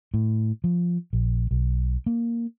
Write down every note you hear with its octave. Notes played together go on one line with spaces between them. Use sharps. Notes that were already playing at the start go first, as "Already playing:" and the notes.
A2
F3
A#1
B1
A#3